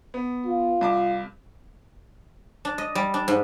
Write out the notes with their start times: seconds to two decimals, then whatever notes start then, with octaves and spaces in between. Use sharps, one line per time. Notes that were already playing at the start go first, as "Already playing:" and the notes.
0.14 B3
0.46 F4
0.81 C2 A5 D6
2.65 D4
2.78 D#5
2.95 G3
3.14 D4
3.28 G#2